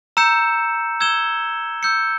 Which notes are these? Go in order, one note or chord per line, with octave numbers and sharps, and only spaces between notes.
A#5 E6 G6 C#7 E7
E6 G#6 E7 G7
E6 G6 C#7